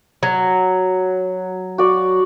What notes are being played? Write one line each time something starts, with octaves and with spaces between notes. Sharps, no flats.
F#3
F#4 D5